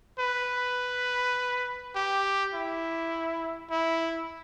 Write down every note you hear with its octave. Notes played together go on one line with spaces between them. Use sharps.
B4
G4
E4
E4